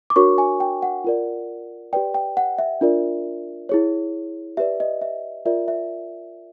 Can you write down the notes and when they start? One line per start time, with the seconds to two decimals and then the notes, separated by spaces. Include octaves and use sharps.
0.10 D6
0.16 D4 F#4 A#4 C#5 C#6
0.38 G#5
0.60 G5
0.82 F#5
1.04 F4 A#4 D5
1.93 G4 B4 D5 G5
2.14 G5
2.37 F#5
2.58 E5
2.81 D4 F4 A#4 D5
3.69 E4 G#4 C#5
4.57 G4 B4 D5 E5
4.80 D#5
5.01 E5
5.45 F4 A#4 D5 E5
5.68 E5